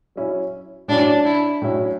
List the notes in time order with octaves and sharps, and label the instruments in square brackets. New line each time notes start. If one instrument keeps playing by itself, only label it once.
[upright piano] F#3 C#4 E4
[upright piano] A2 F#3 C#4 E4 [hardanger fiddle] D4
[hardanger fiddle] E4
[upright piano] A2 F#3 C#4 E4